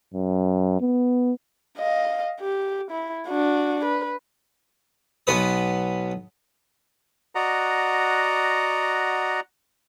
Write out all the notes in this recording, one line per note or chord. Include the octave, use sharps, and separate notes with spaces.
F#2
B3
D#5 F5
G4
E4
D4 F#4
B4
B1 B3 B4 D#6
F#4 D5 D#5 F#5 A#5